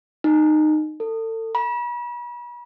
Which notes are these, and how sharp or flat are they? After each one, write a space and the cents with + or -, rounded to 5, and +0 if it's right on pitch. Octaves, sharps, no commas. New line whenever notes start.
D#4 -20
A4 +35
B5 -40